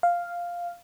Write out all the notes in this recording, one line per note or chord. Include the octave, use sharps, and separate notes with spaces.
F5